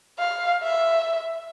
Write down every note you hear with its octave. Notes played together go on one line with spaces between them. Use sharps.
F5
E5